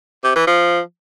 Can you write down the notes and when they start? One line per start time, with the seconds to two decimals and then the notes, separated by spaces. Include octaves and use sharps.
0.24 C3
0.36 E3
0.47 F3